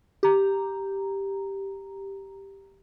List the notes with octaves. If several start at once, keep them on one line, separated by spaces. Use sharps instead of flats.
G4 A#5